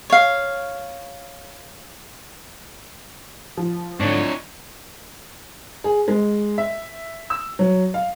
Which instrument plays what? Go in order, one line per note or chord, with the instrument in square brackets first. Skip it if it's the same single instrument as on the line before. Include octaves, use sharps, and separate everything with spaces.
[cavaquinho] C#5 F5
[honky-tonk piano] F3
[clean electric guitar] G#2 D3 [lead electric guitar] D4 E4 [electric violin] C#5
[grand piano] G#4
G#3
E5
E6
F#3
F5